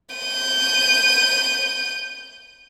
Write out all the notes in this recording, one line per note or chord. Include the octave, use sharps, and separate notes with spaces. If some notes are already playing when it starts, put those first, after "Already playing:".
G6 D#7